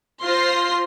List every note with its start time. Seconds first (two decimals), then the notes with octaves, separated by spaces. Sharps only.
0.24 F4 C5 C6 A#6 C7